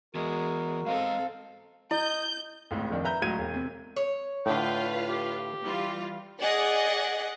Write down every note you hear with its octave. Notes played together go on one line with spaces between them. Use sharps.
E3 G#3 B3 F#4 A#4
G#3 C4 A4 D#5 F5 A#5
E4 D#5 G6
G#1 C#2 A2
F1 A#1 D#3 D4
B4 E5 A#5 G6
C#2 A2 F#3 A#5 G#6 D#7
E1
C3
C#5
A2 D3 F4 B4 F5 G5
G4
E3 G3 F4
G#4 D5 D#5 F#5